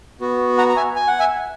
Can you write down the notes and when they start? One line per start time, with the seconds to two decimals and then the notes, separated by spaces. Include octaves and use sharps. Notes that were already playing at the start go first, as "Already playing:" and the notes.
0.21 B3 F#4
0.58 F#5 A#5
0.69 A#5
0.76 E5 G#5
0.96 G#5
1.07 F#5
1.20 E5 G#5